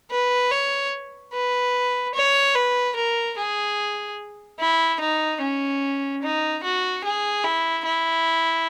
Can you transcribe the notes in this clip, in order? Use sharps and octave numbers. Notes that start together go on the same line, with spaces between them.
B4
C#5
B4
C#5
B4
A#4
G#4
E4
D#4
C#4
D#4
F#4
G#4
E4
E4